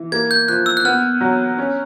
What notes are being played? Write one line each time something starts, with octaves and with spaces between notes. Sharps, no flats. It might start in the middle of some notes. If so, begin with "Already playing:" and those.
Already playing: E3
A#3 G#6
G6
F3 F#6
E6
F#6
B3 F6
F#3
C#4